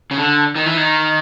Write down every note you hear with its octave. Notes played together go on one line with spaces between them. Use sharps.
C#3
D3
D#3
E3
D#3